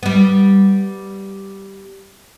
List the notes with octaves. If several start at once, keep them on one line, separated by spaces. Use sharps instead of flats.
G3 B3